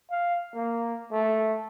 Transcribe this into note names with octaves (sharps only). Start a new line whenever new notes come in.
F5
A#3
A3